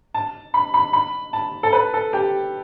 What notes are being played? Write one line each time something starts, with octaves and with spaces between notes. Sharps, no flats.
A5
B5
B5
B5
A5
A4
B4
A4
G4